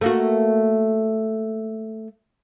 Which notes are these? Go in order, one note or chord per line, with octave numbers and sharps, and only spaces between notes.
A3 A#3 F#4